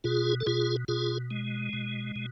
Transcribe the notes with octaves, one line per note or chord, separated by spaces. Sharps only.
B2 F4 G#4
A4
B2 F4 G#4
B2 F4 G#4
G#3
B2
B2